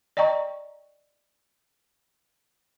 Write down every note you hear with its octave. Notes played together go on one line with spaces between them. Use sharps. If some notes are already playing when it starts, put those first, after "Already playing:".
D5 D#5 G5 A#5 C#6